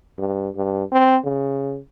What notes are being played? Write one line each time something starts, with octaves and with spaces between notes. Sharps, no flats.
G2
G2
C4
C#3